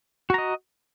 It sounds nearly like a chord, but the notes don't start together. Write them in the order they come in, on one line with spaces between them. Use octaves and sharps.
F#4 A#5 D#5